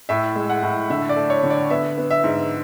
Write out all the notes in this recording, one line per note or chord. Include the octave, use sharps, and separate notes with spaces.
A2 E5
G#3
F#5
A2
D3 E5
D5
A3
C#5
D3
D5
B3 E5
B3
E5
G#2